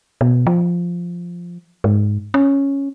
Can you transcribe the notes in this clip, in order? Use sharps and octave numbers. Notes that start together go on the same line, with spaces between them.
B2
F3
G#2
C#4